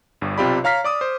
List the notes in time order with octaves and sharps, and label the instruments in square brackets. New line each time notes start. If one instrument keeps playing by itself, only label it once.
[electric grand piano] G1 G2
B1 C3 F4 G4 D5 B5
C#5 F5 A#5 F6 B6 C7
D5 D6 D#6
C5